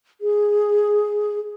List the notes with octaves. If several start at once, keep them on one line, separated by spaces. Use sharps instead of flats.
G#4